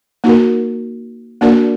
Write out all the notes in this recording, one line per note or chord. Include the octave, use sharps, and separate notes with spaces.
A#3 D#4 F#4 A#4
A#3 D4 F#4 A#4 D5